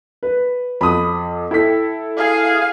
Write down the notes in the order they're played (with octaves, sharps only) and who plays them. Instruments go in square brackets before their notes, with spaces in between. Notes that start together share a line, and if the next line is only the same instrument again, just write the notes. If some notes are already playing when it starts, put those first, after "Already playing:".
[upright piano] B4
[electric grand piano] F2 [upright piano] B5 D#6
[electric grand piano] E4 A4 [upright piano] G5 B6
[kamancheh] G#4 F5